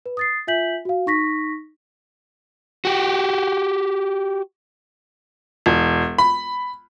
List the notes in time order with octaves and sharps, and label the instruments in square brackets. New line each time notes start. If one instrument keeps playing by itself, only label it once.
[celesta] B4
D#6 A6 C7
F4 E5 G#5 G6 B6 F#7
F#4 F5
D#4 C#6 A#6 B6
[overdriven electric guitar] F#4 G4
[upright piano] E1
B5